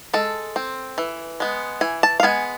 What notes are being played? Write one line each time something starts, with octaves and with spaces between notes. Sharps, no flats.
G#3 A4
C4
E3
G#3 B3
E3 G#5
A5
F5
G#3 B3 G#5